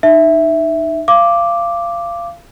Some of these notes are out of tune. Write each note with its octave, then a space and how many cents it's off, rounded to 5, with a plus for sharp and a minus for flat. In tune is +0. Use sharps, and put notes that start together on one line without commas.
D#4 -25 E5 +0
F5 -25 D6 +0